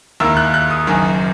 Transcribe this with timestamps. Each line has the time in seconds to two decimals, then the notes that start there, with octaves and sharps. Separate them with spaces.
0.20 D#2 D#3 A#3 E4 E6
0.37 F#6
0.54 F#6
0.70 D#6
0.87 F#1 F#2 D#3